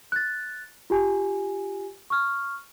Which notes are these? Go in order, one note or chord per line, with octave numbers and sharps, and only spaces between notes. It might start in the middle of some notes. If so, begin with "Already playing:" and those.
F#6 A6
F4 G4 G#5
C#6 F6